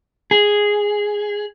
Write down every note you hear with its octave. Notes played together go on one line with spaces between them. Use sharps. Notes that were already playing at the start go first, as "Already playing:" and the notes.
G#4